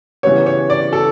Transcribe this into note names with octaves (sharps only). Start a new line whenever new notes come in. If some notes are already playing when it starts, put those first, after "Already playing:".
C#3 E3 G3 B3 C#5
C#5
D5
A4